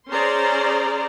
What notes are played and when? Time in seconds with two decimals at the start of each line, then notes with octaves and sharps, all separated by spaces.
0.11 C#4 G#4 C5 D5 A#5 C6